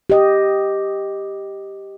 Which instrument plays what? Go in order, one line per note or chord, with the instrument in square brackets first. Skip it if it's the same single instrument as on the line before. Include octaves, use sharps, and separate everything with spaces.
[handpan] G4 D#5